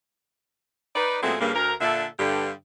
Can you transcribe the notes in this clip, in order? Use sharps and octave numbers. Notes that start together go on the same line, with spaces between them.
D#4 B4 D5
A#2 F#3 G#3 A3 B3 C4
G2 C#3 A#3
D2 A#4
A#2 D3 D4 A4 E5
G2 D3 G4